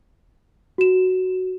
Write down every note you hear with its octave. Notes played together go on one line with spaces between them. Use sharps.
F#4 E7